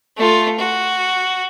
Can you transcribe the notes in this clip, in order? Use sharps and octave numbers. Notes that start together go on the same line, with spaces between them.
A3 F4
F#4